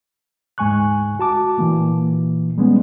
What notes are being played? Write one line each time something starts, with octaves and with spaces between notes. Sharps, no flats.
D2 G#2 G#3 G#5 C#6 F#6
F#4 A5 D6
A#2 E3 A#3
G3 G#3 B3 C#4